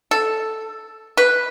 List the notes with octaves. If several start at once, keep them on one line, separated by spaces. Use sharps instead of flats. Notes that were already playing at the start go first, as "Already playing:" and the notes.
A4
B4